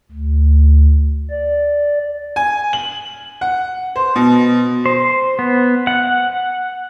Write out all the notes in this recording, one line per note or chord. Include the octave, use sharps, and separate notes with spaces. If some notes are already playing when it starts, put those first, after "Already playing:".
D2
D5
G#5
F#7
F#5
C5
B2
C5
B3
F#5